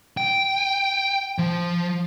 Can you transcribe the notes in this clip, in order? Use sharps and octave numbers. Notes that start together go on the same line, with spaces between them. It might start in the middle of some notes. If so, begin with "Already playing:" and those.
G5
F3